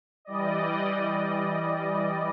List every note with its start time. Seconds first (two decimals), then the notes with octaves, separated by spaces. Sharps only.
0.25 E3 G3 D5 D#5